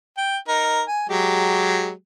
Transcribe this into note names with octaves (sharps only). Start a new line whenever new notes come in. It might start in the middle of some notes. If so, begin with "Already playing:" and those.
G5
D#4 A#4
G#5
F#3 G#3 G4